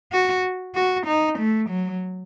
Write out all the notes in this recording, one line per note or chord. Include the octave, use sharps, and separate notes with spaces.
F#4
F#4
D#4
A3
F#3